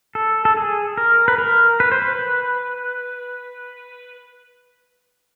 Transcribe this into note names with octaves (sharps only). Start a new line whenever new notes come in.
A4
A4
G#4
A#4
B4
A#4
B4
C5
B4